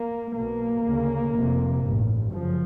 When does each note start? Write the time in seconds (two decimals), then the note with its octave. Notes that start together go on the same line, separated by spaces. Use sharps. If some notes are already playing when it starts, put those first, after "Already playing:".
Already playing: A#3
0.33 B1 B2 A#3
0.83 D2 C#3
1.32 F1 F2 C3
1.81 G2
1.86 A1
2.30 F#1 F#2 C#3 F3